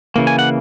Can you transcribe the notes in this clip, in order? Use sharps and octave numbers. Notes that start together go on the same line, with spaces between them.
C#3 E3 A#3
G#5
F#5